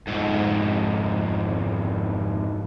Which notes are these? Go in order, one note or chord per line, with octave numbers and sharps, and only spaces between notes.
F2 G#2